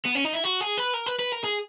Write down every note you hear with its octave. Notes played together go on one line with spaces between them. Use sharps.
B3
C#4
D#4
E4
F#4
G#4
B4
A#4
B4
B4
A#4
G#4